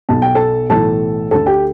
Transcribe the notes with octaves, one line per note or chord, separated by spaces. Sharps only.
B1 B2 A5
G5
A4 A5
B1 A2 E3 A4 A5
D2 D3 A4 A5
G4 G5